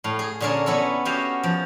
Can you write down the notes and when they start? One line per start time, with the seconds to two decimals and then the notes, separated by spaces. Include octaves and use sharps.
0.04 A2 F5
0.19 G#4
0.40 A#2 D3 C#4 G#4 A#4 A5
0.66 B3 C#4 E4 A4
1.05 C#4 F#4 G4 C#5 D#5 F5
1.43 F3